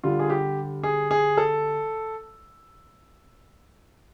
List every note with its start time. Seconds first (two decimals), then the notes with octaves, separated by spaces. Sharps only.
0.03 D3 G3 F4
0.19 G#4
0.30 G4
0.83 G#4
1.11 G#4
1.37 A4